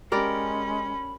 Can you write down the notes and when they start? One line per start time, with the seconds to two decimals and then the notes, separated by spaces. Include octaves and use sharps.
0.12 G#3 C#4 G4 A#4 D5 B5